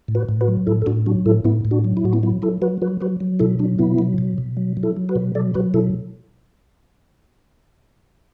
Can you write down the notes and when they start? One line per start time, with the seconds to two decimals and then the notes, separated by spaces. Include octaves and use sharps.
0.08 A2
0.15 F#4 B4
0.29 A2
0.41 F#4 B4
0.48 F#3
0.66 A2 E4 A4
0.82 A4
0.86 A2 D4 F#4
1.06 F#3 D4 F#4
1.26 A2 E4 A4
1.44 A2 B3 E4
1.65 A2
1.71 D4 F#4
1.84 F#3
1.97 E4
2.04 A2 F#4
2.13 B3 E4
2.23 F#3 B3 E4
2.42 F#3 E4 A4
2.62 F#3 F#4 B4
2.82 F#3 F#4 B4
3.01 F#3 F#4 B4
3.20 F#3
3.40 B2 E4 A4
3.59 F#3 D4
3.79 B2 B3 E4
3.98 F#3
4.18 B2
4.38 B2
4.57 F#3
4.77 F#3
4.83 E4 A4
4.97 F#3
5.09 F#4 B4
5.15 B2
5.35 F#3 A4 D5
5.54 F#3 F#4 B4
5.74 B2 E4 A4